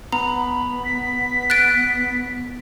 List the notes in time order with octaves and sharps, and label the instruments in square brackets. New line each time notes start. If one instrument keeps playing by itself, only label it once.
[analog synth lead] B3 [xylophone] A#5 [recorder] B5
[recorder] B6
[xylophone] F#6 A6 D7